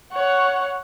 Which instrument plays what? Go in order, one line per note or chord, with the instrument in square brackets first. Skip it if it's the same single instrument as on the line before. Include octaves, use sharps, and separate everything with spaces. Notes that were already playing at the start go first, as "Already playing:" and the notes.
[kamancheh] C#5 F#5